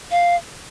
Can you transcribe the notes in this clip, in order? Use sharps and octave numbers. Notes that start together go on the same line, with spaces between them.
F5